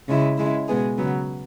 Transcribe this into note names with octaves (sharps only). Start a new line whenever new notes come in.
C#3 G#3 E4
C#3 G#3 E4
B2 G#3 B3 G#4
C#3 F#3 B3